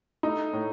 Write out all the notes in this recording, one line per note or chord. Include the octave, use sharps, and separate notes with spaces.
A3 D#4
A2